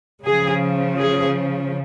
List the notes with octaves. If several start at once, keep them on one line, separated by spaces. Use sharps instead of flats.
C#3 F3 G#4
G#4